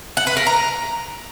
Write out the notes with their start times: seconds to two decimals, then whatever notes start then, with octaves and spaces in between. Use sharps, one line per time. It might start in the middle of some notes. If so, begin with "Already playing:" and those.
0.17 F#5
0.27 B4
0.37 A#4
0.46 A#5